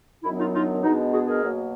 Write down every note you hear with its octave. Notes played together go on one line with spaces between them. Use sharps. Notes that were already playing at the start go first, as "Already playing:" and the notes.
F#2 D#3 F#3 B3 D4 E4
D#4 F4
D#4 F4
B2 G#3 B3 D4 D#4
F#4 G#4
G#4 A#4
B2 F#3 A#3